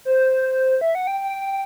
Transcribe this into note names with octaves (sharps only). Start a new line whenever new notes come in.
C5
E5
F#5
G5
G5